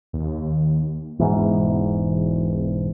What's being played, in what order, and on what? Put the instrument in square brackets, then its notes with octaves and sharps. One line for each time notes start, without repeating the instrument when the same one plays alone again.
[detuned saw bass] D#2
[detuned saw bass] E1 [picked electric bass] E2 G#2